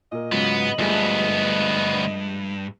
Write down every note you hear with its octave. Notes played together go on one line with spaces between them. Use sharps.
A#2 A#4 D#5
G#2 C#3 F#3 B3 F4
D2 G2 F3 G#3 A3 B3